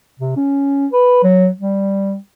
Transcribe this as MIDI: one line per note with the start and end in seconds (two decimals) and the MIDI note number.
0.19 0.33 48
0.36 0.87 61
0.92 1.19 71
1.23 1.48 54
1.58 2.16 55